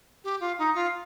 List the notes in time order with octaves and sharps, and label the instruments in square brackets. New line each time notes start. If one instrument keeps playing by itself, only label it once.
[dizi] G4
F4
D#4
F4